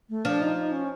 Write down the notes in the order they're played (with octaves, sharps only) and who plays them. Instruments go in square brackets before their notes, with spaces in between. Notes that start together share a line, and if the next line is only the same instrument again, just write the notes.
[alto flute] A3
[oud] F3 [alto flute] D4
[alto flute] D#4
D#4
C#4